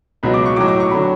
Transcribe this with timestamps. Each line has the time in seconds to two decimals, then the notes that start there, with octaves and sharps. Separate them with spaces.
0.23 C#2 B2 F#3 B5
0.34 D6
0.46 C#6
0.56 A2 F#3 D6
0.68 D6
0.80 C#6
0.91 D3 F#3 B5